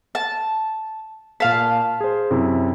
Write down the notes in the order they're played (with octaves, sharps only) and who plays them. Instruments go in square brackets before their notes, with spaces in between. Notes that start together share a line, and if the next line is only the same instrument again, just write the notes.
[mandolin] A5
[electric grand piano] A#2 F6 B6 [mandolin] F5 A5
[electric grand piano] G#4 C5
F#2 C3 E4